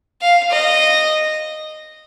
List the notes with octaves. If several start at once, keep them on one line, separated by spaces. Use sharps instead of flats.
F5
D#5